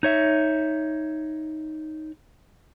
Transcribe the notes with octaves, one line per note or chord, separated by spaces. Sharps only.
D#4 C#5 E5